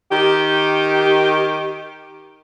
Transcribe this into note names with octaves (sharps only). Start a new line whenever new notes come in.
D#3 G4